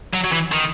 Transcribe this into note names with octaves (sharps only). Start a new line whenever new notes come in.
F#3
F#3
E3
D#3